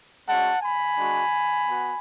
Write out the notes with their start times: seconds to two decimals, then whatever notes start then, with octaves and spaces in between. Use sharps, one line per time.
0.26 G#3 C#4 F#4 F#5 A5
0.62 G#5 B5
0.97 G#3 D4 F#4
1.67 B3 F#4